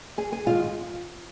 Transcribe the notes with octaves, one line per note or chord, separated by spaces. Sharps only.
G#4 G#5
G#4 G#5
G#2 D#3 G#3 F4 F5